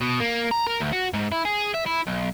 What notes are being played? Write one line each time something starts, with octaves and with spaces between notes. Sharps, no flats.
B2
A#3
A#5
A#4
D2
F#4
G#2
E4
G#4
E5
E4
B1